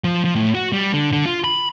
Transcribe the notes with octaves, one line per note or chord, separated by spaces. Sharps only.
F3
F3
A2
F#4
G3
D3
D3
F4
B5